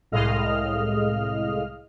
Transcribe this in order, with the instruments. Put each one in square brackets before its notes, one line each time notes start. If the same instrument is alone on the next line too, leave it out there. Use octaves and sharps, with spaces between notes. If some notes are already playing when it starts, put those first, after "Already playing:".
[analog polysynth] C2 A2 G#3 D#5 F5 F6